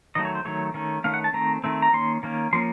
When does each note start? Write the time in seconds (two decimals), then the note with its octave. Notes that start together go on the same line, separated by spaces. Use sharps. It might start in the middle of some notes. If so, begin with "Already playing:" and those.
0.15 D#3 F#3 A3 D#5
0.25 C#5
0.35 C5
0.45 D#3 F#3 A3 C#5
0.74 D#3 A3 C#4
1.04 D#3 A3 C#4 F5
1.14 F#5
1.24 A5
1.33 D#3 A3 C4 A#5
1.64 D#3 A3 C4
1.82 A#5
1.93 D#3 A#3 C#4 C6
2.23 D#3 A#3 C#4
2.53 F3 A#3 C#4 C6